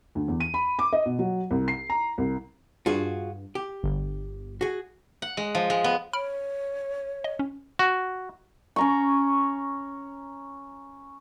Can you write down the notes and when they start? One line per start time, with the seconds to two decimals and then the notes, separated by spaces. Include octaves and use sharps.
0.15 D2
0.28 E2
0.40 D#7
0.54 B5
0.79 D6
0.93 D#5
1.06 B2
1.19 F#3
1.51 C2
1.68 C7
1.90 A#5
2.18 C2
2.86 G2 F4 F#4 G#4
3.55 G4
3.83 G1
4.61 F#4 G#4
5.22 F#5
5.37 G#3
5.55 F3
5.70 G#3
5.84 B3
6.13 C#5 B5 F6 D7
7.24 D#5
7.39 C#4
7.79 F#4
8.76 C#4 A#5 C#6